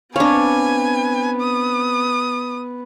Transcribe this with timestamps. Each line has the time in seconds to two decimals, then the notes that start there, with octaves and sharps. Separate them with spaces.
0.16 B3 C4 D4 B4 C#5 F5 G#5
1.42 D#6